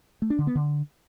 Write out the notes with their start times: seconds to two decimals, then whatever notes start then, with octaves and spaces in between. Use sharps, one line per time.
0.22 A3
0.30 D4
0.39 D3
0.47 B3
0.55 D3